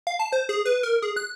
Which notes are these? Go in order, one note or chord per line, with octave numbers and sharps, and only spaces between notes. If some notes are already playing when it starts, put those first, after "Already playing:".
F5
A5
C5
G#4
B4
A#4
G#4
F#6